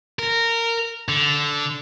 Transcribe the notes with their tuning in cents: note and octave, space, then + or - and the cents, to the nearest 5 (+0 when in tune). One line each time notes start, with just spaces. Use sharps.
A#4 -15
D3 -10